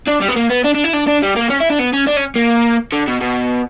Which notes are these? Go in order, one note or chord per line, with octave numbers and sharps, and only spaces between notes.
D4
G3
B3
A#3
B3
D4
D4
E4
D4
D4
G3
A#3
C#4
E4
D4
B3
C#4
D4
C#4
A#3
D3
B2
B2